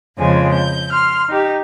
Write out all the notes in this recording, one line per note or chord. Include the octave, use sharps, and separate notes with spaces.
F2 C#3 F3 G#3 G#5
G6
C6 F6
D#4 G4